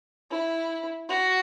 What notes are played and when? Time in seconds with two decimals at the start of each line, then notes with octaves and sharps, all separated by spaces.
0.31 E4
1.09 F#4